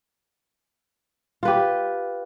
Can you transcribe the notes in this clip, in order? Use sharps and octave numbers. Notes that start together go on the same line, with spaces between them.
F4 G4 B4